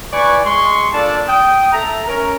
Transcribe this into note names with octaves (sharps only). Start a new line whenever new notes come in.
E4 B4 D5 G#5 C#6
G#3 C6 C#6
A#3 D4 F4 A4 D5 A5
G5 D#6
A4 E5 A#5
C#4 A#4